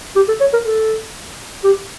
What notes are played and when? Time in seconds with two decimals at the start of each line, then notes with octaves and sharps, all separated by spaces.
0.16 G4
0.28 A4
0.41 C#5
0.53 A#4
0.65 A4
1.64 G4